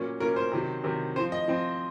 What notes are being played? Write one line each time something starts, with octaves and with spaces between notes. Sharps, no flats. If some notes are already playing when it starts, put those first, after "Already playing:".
Already playing: A#2 F#3 A#3 C#4
A#2 F#3 A#3 C#4 A#4
C5
C3 D#3 F#3
C3 D#3 F#3
F3 C4 C5
D#5
F3 C4